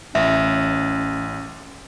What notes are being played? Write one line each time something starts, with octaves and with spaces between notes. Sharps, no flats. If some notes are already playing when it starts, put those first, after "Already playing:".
A1 C#4 E5